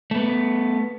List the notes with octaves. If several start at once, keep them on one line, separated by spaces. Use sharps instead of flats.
A3 B3